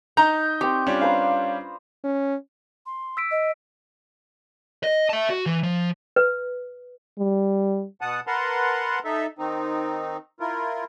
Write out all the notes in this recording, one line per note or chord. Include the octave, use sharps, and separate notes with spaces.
D#4 D#5 A#5 G6
C4 G4 D5 C#6
G3 C#4 D4 F4
B4 C5 F5 A#5
C#4
C6
E6 B6 D7
D#5
D#5
E5 A5
F#4
E3
F3
B4
G3
B2 F#5 A5 D#6
A#4 B4 F#5 A5 A#5 C6
D#4 A4 E5
D#3 C4 D#4
E4 F4 A#4